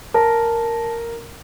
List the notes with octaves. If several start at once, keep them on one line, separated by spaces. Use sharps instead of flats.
A#4 A5